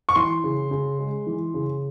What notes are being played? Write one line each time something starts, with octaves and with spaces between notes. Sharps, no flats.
C#6
E3 C6
C#3
C#3
G#3
E3
C#3